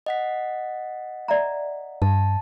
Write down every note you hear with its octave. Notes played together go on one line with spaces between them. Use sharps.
D#5 F#5 B6
D5 E5 A#5
G2 A5